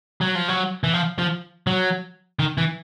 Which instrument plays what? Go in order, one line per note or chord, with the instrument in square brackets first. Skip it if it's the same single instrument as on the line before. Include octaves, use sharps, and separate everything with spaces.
[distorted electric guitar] F#3
F3
F#3
E3
F3
F3
F#3
D#3
E3